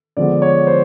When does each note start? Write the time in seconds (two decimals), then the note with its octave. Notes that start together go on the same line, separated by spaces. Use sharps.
0.17 D3 F3 G#3 B3 D5
0.42 C#5
0.67 C5